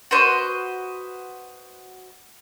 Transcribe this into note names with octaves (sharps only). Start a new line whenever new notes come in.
F#4 B4 C5 D#5